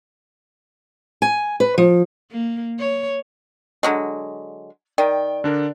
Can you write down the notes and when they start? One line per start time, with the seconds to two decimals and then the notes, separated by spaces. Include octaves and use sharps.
1.22 G#5
1.60 B4
1.78 F3
2.32 A#3
2.79 C#5
3.83 D3 F#3 G#3
4.98 D#3 D5 G5
5.44 D3 D4 A#4